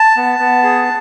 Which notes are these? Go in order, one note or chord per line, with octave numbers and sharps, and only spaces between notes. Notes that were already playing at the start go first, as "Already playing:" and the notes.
Already playing: A5
B3
B3
G#4